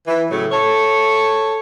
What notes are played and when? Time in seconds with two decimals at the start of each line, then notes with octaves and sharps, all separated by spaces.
0.07 E3
0.31 A2 C#3 F#3 A3
0.52 A4 C#5